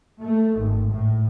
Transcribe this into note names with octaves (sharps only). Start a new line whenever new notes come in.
A3
G#1
A2